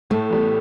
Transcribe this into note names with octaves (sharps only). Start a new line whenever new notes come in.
A2 A3
E3 G3 B3